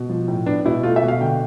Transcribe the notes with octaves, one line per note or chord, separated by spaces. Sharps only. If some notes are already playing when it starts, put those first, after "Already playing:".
Already playing: B2
F3
A2
B3 D4
B2 E4
A3 F4
E5
B2
F5
D3 G5